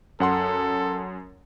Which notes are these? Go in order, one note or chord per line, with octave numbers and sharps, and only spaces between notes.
F#2 A4 F#5 C6